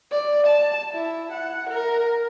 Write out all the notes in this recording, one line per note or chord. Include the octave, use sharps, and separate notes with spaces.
D5
A5
E4
F#5
A#4